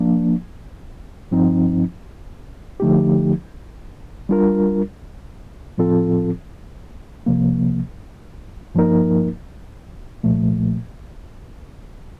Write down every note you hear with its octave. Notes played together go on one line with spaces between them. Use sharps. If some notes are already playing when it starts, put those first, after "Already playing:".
Already playing: F3 A#3 D4
G2 F3 C4 D#4
D3 F3 A3 D#4 G4
G3 D4 F4 A#4
A2 F3 C4 F4 A4
C2 C3 F3 A#3
G2 F3 A#3 D#4 A#4
C2 A#2 F3 A3